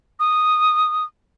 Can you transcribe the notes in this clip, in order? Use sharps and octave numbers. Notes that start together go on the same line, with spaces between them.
D#6